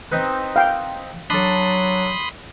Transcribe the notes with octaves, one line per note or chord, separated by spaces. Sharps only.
C4 D#4 B4
F5 G5
F#3 D4 A4 B5 C6 D#6